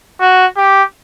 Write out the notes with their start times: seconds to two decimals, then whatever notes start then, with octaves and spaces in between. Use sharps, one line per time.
0.20 F#4
0.57 G4